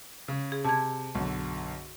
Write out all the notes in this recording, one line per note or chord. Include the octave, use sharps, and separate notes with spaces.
C#3
G#4
C3 A5 G#6
B1 F#2 D3